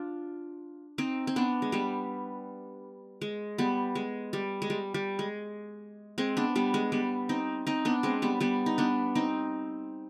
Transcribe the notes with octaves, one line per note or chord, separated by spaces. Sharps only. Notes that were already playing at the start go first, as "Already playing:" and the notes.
Already playing: D4 F4
C4 D#4
C4
B3 D4
G#3
G3 B3
G#3
G3 B3
G#3
G3
G#3
G3
G3
G#3
G#3 C4
B3 D4
G3 B3
G#3
G3 B3
C4 D#4
C4 D#4
B3 D4
G#3 C4
G3 B3
G3 B3
D#4
B3 D4
C4 D#4